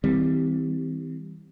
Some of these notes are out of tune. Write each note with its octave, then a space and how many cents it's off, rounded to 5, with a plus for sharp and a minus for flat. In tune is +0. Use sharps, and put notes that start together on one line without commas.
E3 -40 G3 +0 C4 -20